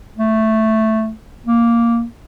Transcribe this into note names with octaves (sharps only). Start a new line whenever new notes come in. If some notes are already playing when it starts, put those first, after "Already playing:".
A3
A#3